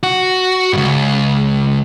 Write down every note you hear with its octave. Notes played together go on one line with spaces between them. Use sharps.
F#4
C#2 G2